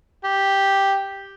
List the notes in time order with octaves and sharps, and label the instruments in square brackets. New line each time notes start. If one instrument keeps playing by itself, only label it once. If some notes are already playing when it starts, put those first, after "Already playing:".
[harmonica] G4